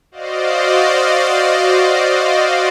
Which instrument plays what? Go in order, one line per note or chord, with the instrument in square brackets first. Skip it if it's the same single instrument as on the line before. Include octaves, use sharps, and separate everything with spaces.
[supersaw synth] F#4 C5 D5 D#5 F5